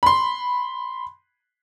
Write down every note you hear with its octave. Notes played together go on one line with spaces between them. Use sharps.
B5 C6